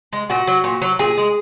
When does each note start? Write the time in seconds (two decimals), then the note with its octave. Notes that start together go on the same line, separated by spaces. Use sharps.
0.13 G#3
0.30 A#2 F#4
0.47 F#3
0.64 A#2
0.81 F#3
0.99 A#2 G#4
1.17 G#3